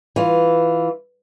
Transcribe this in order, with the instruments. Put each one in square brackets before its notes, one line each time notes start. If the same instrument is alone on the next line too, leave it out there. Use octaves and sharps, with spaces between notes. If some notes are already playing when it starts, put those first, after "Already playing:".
[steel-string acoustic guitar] E3 F4